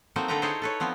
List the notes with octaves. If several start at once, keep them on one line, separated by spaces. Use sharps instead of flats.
F#3 A3 A#3 C4 D#4 F#4
D3 C4 A4 B4 G5 A#5
D#4 E4 G#4 A4 C5 C#5
A4 B4 C#5
F3 B3 C4